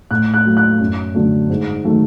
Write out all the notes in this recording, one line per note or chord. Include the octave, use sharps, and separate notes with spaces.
A2 F#6
F#6
F#3 A3
F#6
F#2
D3 F#3 A3
G#2
D#3 F#3 A3